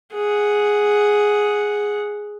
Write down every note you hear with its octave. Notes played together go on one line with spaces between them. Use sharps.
G#4 F#5